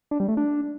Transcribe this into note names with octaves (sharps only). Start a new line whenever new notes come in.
D4
G3
A3
D4